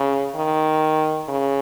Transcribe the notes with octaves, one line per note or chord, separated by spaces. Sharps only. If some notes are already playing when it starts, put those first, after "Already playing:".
Already playing: C#3
D#3
C#3